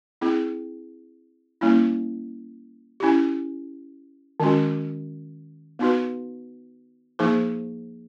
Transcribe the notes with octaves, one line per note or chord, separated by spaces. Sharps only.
C4 E4 G#4
G3 A#3 C#4 E4
C#4 E4 G4
D#3 G#3 C#4 F#4
B3 D#4 F#4 B4
F3 A#3 D#4 G#4 C5